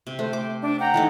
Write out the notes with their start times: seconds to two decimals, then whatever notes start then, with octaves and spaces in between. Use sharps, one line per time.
0.07 C3
0.19 A3 C5
0.33 D6
0.63 D4
0.79 F#5 G5 A#5
0.94 E3 A3 D#4